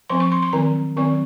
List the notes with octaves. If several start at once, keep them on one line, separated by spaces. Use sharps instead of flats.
F3 C4 C6
C#6
C6
C6
D#3 F#3 C4 A#5
D#3 F#3 C4 C#6